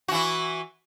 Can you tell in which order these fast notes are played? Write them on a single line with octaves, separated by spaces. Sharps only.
F#4 E3 E4